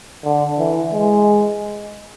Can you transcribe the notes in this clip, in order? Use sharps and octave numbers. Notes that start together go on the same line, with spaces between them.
D3
E3
G#3